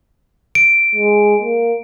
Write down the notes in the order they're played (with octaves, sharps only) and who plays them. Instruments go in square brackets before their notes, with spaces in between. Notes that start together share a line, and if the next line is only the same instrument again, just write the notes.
[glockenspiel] D7
[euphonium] G#3
A#3